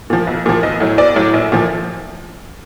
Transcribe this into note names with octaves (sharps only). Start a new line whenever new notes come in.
A#2 F3
B1
A#2 F3
B1 D#5
A2 F#3
B1 D5
A2 F#3
A#1
A#2 F3